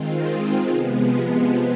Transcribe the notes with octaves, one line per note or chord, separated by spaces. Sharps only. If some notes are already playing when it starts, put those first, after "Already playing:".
Already playing: D#3 G#3 C4 F4
C3 F3 G#3 B3